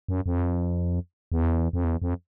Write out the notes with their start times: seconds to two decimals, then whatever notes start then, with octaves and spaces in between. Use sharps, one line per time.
0.08 F#2
0.26 F2
1.32 E2
1.73 F2
1.84 E2
2.02 F2